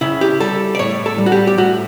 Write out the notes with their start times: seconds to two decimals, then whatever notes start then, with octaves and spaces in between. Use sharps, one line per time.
0.01 C#3 E4
0.21 G4
0.40 G3 A4
0.75 D5
0.79 A2 C#5
1.06 A4
1.18 G3
1.26 F#4
1.32 G4
1.47 G4
1.58 A2 F#4